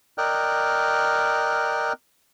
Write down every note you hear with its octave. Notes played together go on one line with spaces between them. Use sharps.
A#4 D5 D#5 G5 F6 F#6